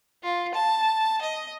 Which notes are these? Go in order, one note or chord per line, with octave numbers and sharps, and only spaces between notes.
F4
A5
D#5